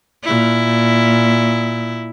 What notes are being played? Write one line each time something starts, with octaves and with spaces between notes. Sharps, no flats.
A#2 E4